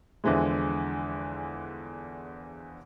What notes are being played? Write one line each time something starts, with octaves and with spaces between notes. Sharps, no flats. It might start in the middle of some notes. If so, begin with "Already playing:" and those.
E2 D3 E3 F3 G#3